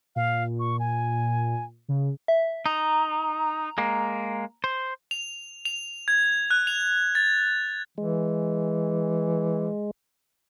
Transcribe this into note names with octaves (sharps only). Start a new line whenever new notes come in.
A#2 F5
C#6
G#5
C#3
E5
D#4 A#5
G#3 A#3
C5
F7
F7
G#6
F#6
F7
A6
E3 G#3